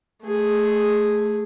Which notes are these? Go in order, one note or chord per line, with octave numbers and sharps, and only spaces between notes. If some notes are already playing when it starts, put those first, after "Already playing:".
A3 G#4